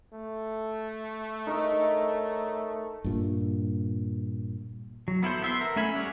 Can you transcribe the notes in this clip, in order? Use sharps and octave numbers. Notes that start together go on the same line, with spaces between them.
A3
D#4 A#4 C#5
G2 A#2
F#3
B3 E4 A4 C5
B3 E5 C6
A#4
A3 C#4 E5 G#5 B5
G3 C#5 D5 F#5